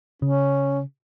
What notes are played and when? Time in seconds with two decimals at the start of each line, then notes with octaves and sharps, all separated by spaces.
0.22 C#3 C#4